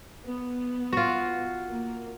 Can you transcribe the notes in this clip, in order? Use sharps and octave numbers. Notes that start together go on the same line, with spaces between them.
B3
F4 F#4
A#3